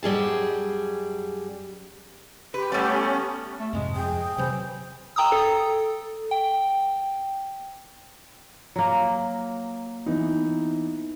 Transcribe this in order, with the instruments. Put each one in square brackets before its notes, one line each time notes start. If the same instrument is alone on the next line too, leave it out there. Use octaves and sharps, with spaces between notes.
[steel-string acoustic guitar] F#2 G3 G#4 A5
[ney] G4 [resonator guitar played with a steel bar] B4
[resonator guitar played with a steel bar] G3 A3 [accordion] B3 C#4
[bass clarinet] A3
[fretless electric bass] F2 G#2 C3 [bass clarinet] G#3
[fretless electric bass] F2 [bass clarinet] G#4 [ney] G5
[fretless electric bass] C3 F#3 [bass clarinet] E3 [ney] C5
[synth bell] G5 A#5 D#6 E6
A4
G5
[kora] F#3 A#3
[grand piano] E3 B3 D#4